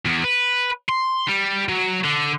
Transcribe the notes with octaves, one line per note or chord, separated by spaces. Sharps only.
E2
B4
C6
G3
F#3
D3